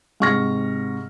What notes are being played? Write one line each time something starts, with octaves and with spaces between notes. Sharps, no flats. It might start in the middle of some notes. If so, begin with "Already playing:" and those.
G#2 C3 C#6 F6 A#6